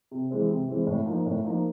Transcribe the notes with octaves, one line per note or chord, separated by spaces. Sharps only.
C3
E3 G#3 C4
C3
E3 G#3 C4
A2
F3 A#3 D#4
A2
F3 A#3 D#4